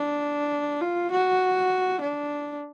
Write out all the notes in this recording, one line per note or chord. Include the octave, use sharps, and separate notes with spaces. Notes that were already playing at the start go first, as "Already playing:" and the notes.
Already playing: D4
F4
F#4
D4